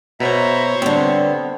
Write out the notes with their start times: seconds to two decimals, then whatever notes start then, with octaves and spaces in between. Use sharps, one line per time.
0.20 B2 C5 C#5 E5 A#5 B5
0.82 D3 G3 B3 C4